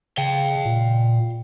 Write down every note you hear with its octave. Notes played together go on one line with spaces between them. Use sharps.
C#3 F5 G5
A#2